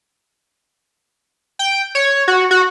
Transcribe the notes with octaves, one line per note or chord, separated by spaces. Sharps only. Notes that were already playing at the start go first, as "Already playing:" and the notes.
G5
C#5
F#4
F#4